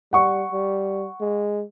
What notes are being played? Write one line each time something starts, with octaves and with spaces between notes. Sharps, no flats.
G3 F#5 C#6
G3
G#3